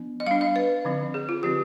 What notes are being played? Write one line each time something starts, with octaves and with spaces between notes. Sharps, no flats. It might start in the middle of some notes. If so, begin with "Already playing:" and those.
Already playing: F3 B3 D4
D#5
G3 D4 F5
D#5
B4
D3 F3 C4
G#4
F4
D3 F3 C4 G4